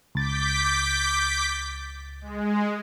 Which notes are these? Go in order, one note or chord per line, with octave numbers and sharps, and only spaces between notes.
C#2 D6 G6 A6 B6
G#3